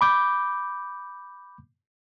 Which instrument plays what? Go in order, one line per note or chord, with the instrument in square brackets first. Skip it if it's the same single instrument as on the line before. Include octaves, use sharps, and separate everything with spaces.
[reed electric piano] B5 D6 G6